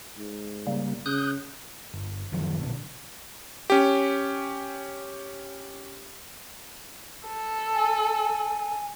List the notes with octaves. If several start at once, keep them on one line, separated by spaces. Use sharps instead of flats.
G#2
C#3 G3 A#3
C#3 D#6 F#6 G6
G1
F#2 D#3 F3
A#1 B2 D3
C#4 G4
A4
G#5